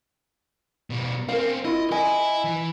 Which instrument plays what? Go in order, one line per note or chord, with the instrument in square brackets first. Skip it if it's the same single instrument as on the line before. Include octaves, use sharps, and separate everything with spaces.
[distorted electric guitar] B2 G3
[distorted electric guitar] C4 C#4 [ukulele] A#4 F5
[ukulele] E4 F4 [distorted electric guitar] D#5
[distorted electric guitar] E4 [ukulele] D#5 G#5
[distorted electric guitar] E3